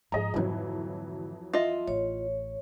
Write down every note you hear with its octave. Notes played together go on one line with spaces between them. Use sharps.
G#2 F3 G#4 D#5 A#5
F2 G#2 D3 E3 F#3
F4 D#5 E5
A1 C#5